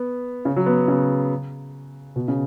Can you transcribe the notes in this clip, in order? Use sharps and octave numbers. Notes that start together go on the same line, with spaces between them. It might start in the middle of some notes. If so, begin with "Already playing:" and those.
Already playing: B3
C#3
F#3
B3
C#3
B2
C#3